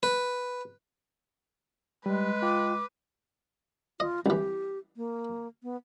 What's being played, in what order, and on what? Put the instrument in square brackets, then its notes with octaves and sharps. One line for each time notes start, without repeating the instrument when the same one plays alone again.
[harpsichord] B4
[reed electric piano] G3 [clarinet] G#3 [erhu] B4
[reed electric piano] F4 G5 [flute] D6
[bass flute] F4 [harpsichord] D#5
[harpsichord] C2 E3 [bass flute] G4
[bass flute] A#3
B3